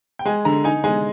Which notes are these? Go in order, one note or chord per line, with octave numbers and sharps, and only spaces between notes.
G5
G#3 G#5
D3 A#5
D#4 G#5
G#3 G#5